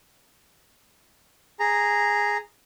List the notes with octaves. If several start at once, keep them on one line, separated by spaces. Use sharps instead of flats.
G#4 A#5